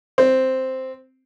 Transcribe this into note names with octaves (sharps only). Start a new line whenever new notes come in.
C4